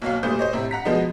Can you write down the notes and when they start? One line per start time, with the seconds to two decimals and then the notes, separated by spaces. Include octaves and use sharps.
0.02 B1 A#3 C#5 F5
0.23 A#2 G3 A3 C5 D#6 G6
0.39 C5 C#5 D#5
0.53 A2 C3 E5
0.71 F#5 A#5 B6
0.85 B2 F3 G#3 B3 D#4